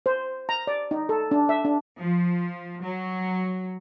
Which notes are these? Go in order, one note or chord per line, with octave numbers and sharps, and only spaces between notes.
C5
A#5
D5
D#4
A4
D4
E5
D4
F3
F#3